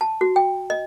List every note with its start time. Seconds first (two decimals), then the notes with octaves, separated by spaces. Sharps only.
0.01 A5
0.21 F#4
0.36 G5
0.70 D#5